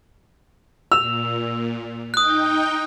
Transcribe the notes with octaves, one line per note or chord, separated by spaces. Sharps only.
A#2 E6 F7
D#4 G5 D#6 F#6 G6